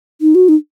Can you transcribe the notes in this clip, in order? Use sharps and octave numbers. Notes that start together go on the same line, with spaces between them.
D#4
F#4
D#4